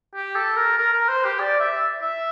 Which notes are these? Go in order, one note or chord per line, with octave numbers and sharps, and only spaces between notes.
G4
A4
A#4
A#4
A#4
C5
G4
D5
E5
E5